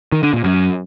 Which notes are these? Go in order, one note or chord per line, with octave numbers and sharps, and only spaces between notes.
D#3
D3
A#2
F#2